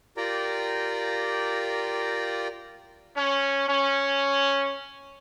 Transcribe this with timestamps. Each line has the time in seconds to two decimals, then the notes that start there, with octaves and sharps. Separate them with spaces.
0.17 F4 G4 A#4 D5 G5 A#5
3.16 C#4
3.68 C#4